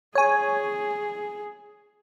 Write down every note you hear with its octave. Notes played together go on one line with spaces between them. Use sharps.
G#4 C#5 G#5